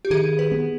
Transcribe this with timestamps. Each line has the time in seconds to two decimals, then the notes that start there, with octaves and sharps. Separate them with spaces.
0.05 G4
0.10 D#3 G#4
0.39 B4
0.51 B3